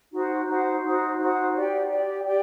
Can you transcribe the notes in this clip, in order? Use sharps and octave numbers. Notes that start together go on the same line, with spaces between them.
D#4 F#4 C5 F#5
D#4 F#4 C5 F#5
D#4 F#4 C5 F#5
D#4 F#4 C5 F#5
G4 D5 G5
G4 D5 G5
G4 D5 G5